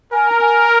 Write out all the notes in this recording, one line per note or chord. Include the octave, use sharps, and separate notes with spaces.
A#4 G#5
A#5
G#5